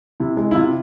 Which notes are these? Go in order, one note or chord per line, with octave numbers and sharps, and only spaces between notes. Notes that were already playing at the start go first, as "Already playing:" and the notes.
C3 E4
G#3
E4
C3 F4